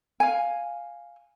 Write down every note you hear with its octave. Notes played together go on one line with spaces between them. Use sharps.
F5 G#5